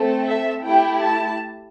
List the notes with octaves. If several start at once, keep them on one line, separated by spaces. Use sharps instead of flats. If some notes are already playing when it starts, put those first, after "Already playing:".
Already playing: A3 C4 A4
E5
A3 E4 G4 G5
A5